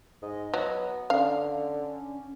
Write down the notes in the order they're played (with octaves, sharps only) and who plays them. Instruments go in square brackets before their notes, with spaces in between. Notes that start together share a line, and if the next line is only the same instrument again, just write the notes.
[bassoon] G#2 [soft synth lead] D#5
[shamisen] F#3 [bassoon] B3
[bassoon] D3 [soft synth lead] C#4 [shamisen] F5